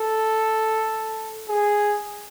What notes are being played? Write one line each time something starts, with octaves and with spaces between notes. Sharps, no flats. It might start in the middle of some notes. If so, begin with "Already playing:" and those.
Already playing: A4
G#4